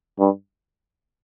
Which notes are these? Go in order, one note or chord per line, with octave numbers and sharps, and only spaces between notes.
G2